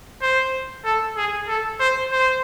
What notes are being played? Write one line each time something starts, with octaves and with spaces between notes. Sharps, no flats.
C5
A4
G#4
A4
C5
C5